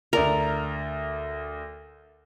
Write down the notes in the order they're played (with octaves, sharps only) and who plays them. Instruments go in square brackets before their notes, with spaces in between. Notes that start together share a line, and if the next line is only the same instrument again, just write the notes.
[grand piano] D2 D5 F7 [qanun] A#4